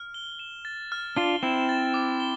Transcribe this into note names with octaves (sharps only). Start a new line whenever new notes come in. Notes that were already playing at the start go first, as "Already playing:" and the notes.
Already playing: F6
G7
E7
A6
F6
D4 F4 G7
C4 E4 E7
A6
D6
G7